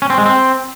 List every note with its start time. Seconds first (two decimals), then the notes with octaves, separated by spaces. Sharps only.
0.02 C#4
0.10 C4
0.18 G#3
0.26 C4